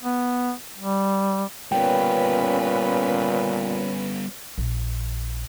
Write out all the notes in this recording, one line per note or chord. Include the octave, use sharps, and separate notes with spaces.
B3
G3
A#2 G3 B3 C#4 B4 G5
A#1